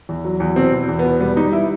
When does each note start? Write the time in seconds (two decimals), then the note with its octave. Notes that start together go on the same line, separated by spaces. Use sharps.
0.09 E2
0.25 F#3
0.40 E2
0.56 B2 C4
0.73 E2
0.89 E2
0.99 B2 B3
1.21 G3 B3
1.36 G3 D#4
1.53 E4